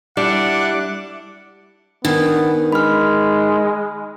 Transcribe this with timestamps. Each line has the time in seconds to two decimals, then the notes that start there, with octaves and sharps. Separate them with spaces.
0.17 G3 D4 E4 F#5 D6
2.05 D#3 B3 D4
2.72 G#3 B5 F6